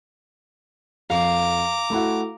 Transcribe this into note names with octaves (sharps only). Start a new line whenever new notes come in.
F2 F5 A#5 D6
A3 E4 F#4